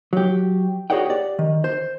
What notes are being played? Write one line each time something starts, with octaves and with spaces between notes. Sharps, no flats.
F#3 G4
F#4 G#4 C#5 D5 F#5 G5
G4 D5
D#3
C5